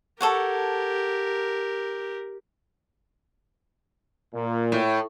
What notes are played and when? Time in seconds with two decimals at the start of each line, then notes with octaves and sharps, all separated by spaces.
0.21 G4 A4 A#4 C#5 F#5
4.34 A#2
4.72 A2